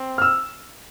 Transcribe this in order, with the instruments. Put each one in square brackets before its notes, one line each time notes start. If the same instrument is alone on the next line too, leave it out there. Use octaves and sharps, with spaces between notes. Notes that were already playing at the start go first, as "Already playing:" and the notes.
Already playing: [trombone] C4
[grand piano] F6
E6